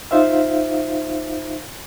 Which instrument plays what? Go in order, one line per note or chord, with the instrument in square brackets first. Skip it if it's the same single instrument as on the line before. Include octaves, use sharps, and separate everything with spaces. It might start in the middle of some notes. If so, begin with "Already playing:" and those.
[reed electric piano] D#4 F4 C5 E5 F5